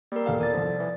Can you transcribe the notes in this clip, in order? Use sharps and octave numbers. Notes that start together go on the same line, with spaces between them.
G3 A#3 A#4
E1 A4 F5
A#2 D5 A6
C2 F2 D3
E3